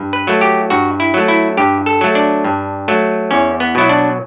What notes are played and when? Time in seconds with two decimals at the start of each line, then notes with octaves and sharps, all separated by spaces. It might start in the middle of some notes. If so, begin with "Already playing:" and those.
Already playing: G2
0.13 B4
0.27 F#3 A3
0.41 G4
0.70 G2 F#4
1.00 E4
1.14 F#3 A3
1.28 E4
1.57 G2 G4
1.86 A4
2.01 F#3 A3
2.15 D4
2.44 G2
2.88 F#3 A3
3.31 E2 C#4
3.60 B3
3.75 B2 F#3 E4
3.89 D4